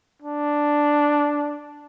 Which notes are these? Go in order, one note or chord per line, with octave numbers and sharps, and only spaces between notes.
D4